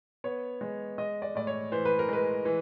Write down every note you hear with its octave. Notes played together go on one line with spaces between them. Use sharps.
B3 C#5
G#3
G#3 D#5
D5
A2 D5
C#5
E3 C5
B4
A#4
G#3 B4
E3